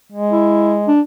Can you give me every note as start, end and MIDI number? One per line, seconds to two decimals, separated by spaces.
0.12 0.89 56
0.31 0.77 64
0.88 1.01 62